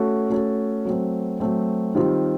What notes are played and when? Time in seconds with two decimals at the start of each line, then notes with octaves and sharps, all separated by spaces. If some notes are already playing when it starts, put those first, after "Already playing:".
Already playing: A3 C#4 F#4 A4
0.30 A3 C#4 F#4 A4
0.85 F#3 A3 C4
1.40 F#3 A3 C4
1.95 D#3 G3 C4 F4